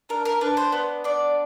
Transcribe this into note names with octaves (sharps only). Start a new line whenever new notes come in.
D4 A#4
A#4
D4 B4
C5
B3
D4 D5